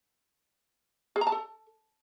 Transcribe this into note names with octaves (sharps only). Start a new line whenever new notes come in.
G#4
A#5
A5
A4